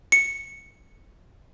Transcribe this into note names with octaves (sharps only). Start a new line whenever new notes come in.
C#7